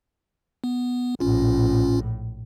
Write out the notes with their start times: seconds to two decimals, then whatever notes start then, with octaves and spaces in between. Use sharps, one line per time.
0.64 B3
1.20 A#1 A2 C#4 F4